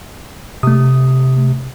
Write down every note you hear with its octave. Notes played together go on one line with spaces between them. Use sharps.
C3 A3 D#6